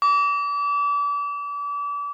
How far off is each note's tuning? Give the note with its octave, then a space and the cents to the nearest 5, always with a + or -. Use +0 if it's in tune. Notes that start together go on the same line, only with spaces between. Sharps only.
D6 -35